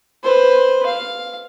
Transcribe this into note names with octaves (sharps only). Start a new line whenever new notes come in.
B4 C5
F5